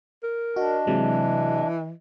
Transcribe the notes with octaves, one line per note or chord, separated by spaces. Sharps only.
A#4
D4 F#4 D#5
C3 E3 F#3 G#3